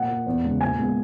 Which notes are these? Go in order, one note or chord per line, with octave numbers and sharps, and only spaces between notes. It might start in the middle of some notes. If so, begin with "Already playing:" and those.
Already playing: A#2 F#5
A#3
E2
C#3 G#3
A#2 G#5
G#3 B3